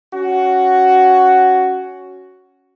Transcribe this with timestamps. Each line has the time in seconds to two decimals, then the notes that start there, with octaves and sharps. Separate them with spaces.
0.14 C#4 F#4